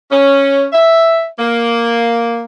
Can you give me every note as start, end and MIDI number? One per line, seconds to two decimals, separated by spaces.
0.12 0.66 61
0.73 1.25 76
1.39 2.44 58